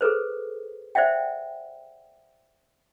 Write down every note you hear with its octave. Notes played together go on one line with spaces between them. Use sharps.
G#4 A4 B4 C5
C5 D5 E5 F#5 G5